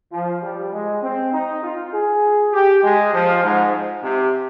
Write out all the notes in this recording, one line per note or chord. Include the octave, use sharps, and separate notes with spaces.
F3
G3
G#3
C4
D#4
F4
G#4
G4
G#3
F3
G#2
C3